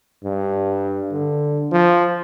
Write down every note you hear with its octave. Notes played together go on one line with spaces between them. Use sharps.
G2
D3
F3